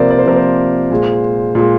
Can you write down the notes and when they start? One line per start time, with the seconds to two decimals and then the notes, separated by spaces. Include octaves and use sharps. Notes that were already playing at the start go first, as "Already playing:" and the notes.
Already playing: C3 F3 A#3 A#4 C5 D5
0.10 D5
0.19 C5
0.26 C3 F3 A#3 A#4
0.36 C5
0.91 A#2 G#3
1.55 A#2 G#3